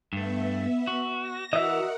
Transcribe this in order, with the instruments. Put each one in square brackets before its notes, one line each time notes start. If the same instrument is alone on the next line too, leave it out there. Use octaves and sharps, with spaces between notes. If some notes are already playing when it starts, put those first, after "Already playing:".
[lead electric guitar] G2 A3 [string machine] B3 E5
[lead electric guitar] F#4
[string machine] A#6
[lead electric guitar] E3 [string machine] F#4 A#4 F#5 [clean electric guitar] D#5 E5